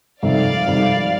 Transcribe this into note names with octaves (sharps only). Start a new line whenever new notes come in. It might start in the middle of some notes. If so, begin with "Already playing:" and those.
F2 C3 D#3 G3 D5 F5
F2 C3 D#3 G3